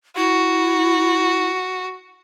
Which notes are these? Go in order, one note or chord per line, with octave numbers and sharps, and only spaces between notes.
E4 F#4